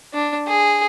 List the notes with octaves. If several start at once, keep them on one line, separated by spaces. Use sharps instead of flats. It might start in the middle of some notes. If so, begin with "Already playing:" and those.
D4
G#4